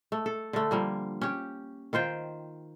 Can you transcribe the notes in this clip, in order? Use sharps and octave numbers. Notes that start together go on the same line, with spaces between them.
A3
A4
D3 A3
F3 G3 A#3
C#4 G4
D#3 F4 C5 G5